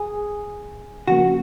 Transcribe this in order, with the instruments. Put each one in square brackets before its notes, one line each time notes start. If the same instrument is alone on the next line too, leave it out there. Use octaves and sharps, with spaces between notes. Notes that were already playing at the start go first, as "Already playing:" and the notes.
Already playing: [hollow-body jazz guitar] G#4
[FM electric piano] C#3 F3 A#3 [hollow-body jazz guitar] F#4